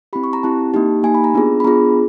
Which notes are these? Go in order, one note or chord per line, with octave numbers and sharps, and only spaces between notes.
C4 E4 G4 B5
C#6
A#5
C4 E4 G4 A5
A#3 D#4 G4
A#3 D#4 G4 G#5
B5
A#5
B3 D4 F4 G#4
B5
B3 D4 F4 G#4 A#5